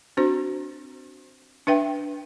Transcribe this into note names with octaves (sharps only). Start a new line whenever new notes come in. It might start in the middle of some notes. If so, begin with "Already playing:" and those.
C4 D4 F#4 C5
D4 B4 E5 G5